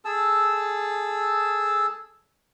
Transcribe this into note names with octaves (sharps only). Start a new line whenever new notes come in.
G#4 A4 A5 E6